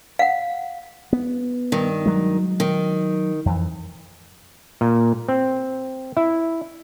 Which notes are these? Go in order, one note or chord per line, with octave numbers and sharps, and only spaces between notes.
F5 F#5
B3
G2 D#3
F#3 G#3
D#3
F2 E3
A#2
C4
E4